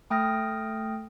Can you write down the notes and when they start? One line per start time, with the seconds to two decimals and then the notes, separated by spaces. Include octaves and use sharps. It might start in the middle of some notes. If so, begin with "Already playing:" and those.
0.10 A3 G5 D#6 F6 A#6